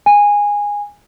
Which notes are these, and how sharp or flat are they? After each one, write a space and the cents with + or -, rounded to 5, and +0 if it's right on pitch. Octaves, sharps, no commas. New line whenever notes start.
G#5 -15